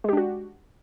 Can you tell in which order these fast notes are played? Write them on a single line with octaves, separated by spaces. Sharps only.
G#3 G4 D4 F#4